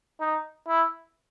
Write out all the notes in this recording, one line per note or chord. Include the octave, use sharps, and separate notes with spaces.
D#4
E4